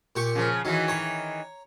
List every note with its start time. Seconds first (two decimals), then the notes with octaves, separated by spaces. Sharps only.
0.16 A#2 G4 C#6
0.35 C#3 F3
0.65 D#3 E3 F#3
0.88 C#5 A#5